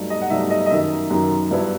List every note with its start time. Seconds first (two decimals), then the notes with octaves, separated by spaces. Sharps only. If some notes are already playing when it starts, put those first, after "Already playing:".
Already playing: G2 F#3 A3 D#4
0.10 D#5
0.22 F#5
0.30 G2 F#3 A3 D#4 E5
0.50 D#5
0.66 D#5
0.70 F#2 D#3 F#3 E5
1.10 F#2 D#3 F#3
1.51 G2 F#3 B3 E4